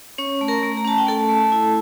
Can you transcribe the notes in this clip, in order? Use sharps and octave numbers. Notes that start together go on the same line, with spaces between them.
C#4 C#5 C#6
A3
A#4 A#5
A3
A#5
C#4 A5
G5
A3 A4 A5
A3
E4